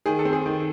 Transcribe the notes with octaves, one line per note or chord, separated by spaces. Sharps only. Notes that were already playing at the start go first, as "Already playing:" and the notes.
D#3 G#4
A4
C4
G#4
D#3